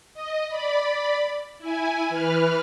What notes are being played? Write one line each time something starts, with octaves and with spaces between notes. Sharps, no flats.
D#5
D5 B5
E4 G#5
E3 B4 F6